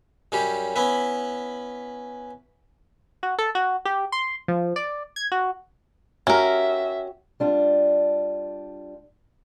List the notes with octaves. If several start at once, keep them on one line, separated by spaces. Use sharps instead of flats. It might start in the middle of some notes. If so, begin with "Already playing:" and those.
F#2 G3 C#4 G4
B3 C#4 E4 B4
F#4
A4
F#4
G4
C6
F3
D5
G#6
F#4
C#4 F#4 G4 A#4 E5
G3 D4 F4